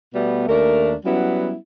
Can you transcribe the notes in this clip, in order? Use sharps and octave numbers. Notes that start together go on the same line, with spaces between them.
B2 G3 A3 B3
D#2 A3 D4 A#4
F#3 G3 B3 C#4 E4